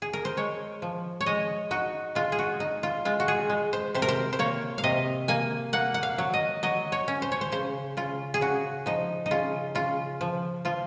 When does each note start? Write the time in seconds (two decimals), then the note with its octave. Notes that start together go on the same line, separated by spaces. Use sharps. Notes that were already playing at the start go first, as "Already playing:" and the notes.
0.02 G#4
0.13 A#4
0.25 C5
0.37 G#3 C#5
0.82 F3
1.21 C#5
1.26 G#3 D#5
1.71 D#4 F#4
2.15 G#3 F4
2.32 G#4
2.39 F#4
2.60 D#4
2.83 F4
3.05 G#3 F4
3.20 F#4
3.28 G#4
3.50 G#3
3.73 C5
3.94 C3 C5
4.02 A#4
4.08 C5
4.33 C5
4.39 A#3 C#5
4.78 F5
4.84 C3 D#5
5.28 A#3 G#5
5.73 A#3 F#5
5.94 F#5
6.03 F5
6.18 F#3
6.34 D#5
6.63 F#3 D#5
6.92 C#5
7.08 C#4
7.22 C5
7.32 C#5
7.41 C5
7.52 C#3 C5
7.97 C#3 F4
8.34 G#4
8.41 C#3 F#4
8.86 F3 D#4
9.26 D#4
9.31 C#3 F4
9.75 C#3 F4
10.21 F3
10.65 F3 F4